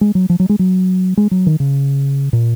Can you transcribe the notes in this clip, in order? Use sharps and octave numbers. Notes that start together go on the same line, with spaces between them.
G#3
F#3
F3
F#3
G#3
F#3
G#3
F#3
D#3
C#3
A#2